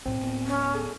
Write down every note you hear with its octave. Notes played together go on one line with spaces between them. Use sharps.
B1 A2 C4
D1 A2 B3
C#4
G#4 A4